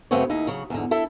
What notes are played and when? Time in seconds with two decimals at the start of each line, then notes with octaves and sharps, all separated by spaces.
0.11 F#2 C#3 A3 B3 C4 C#5
0.30 D#2 D#4 E4
0.47 C#3 F#3
0.70 E2 G#2 D3
0.91 E4 A4 E5